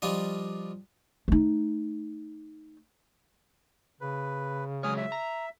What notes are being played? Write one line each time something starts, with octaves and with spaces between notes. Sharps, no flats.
F3 G3 D4 F4 D#5
A3 D#4
C#3 B4
F#3 G#3 G#4 C#5 D#6 F6
E5
A#5